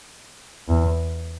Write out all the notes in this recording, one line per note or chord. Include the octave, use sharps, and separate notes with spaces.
E2